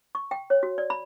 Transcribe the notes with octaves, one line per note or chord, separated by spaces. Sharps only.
C#6
G5
C#5
F#4
D5
B5